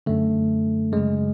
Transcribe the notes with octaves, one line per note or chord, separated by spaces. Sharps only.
F#2 D3 A3
F#2 C#3 G#3